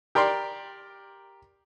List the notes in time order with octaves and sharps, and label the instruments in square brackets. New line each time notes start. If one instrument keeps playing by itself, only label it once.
[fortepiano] G4 A#4 D5 G5 C6